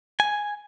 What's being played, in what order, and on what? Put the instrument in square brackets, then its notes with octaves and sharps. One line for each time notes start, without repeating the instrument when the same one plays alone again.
[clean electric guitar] G#5